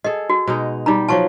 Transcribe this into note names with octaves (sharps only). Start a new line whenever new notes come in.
G#4 A4 D#5
F#4
B2 G#3 D#4
G3 D#4 G4 A#5
F3 F#3 F4 A5 C#6